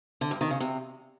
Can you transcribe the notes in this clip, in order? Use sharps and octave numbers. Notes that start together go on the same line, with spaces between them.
D3
G2
D#3
C#3
C3